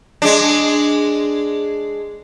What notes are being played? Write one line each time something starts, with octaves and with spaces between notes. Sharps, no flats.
G#3 D4